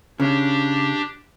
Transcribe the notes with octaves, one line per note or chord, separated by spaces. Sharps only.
C#3 D4 G4